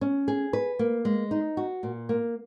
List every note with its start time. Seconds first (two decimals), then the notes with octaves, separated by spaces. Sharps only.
0.01 C#4
0.28 G#4
0.53 B4
0.79 A#3
1.05 G#3
1.31 D#4
1.57 F#4
1.83 A#2
2.09 A#3